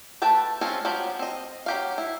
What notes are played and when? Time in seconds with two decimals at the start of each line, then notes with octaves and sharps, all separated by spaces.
0.22 A3 B4 G5 A5
0.61 F3 G#3 C4 C#4 F4
0.85 F3 F#3 G4
1.19 C4 D#5
1.66 F#3 G4 F5
1.98 E4